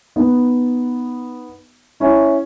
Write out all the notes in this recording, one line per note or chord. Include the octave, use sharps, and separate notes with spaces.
B3 D#4
C#4 E4